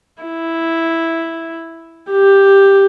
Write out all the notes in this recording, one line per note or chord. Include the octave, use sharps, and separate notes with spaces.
E4
G4